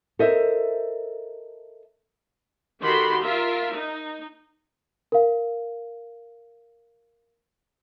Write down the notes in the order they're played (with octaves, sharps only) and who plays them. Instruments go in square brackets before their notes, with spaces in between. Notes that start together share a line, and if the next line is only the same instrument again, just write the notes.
[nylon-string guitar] A4 A#4 C5 D#5 E5
[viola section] D#3 F#4 G4 A4 B5 C6
F4 A#4 E5
D#4
[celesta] A#4 F5